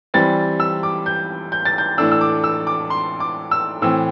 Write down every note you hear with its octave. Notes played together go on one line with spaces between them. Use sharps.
E3 G3 C4 A6
E6
D6
G6
G6
A6
G6
A2 E3 A3 D4 E6
E6
D6
E6
D6
C6
D6
E6
A2 E3 C4 E6